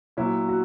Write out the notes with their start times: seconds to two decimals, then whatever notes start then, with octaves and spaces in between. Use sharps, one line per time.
0.17 A#2 F#3 C#4 E4
0.48 F#4